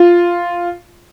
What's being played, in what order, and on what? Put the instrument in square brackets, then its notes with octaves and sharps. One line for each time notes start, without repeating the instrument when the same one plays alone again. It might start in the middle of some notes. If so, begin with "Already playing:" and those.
Already playing: [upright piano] F4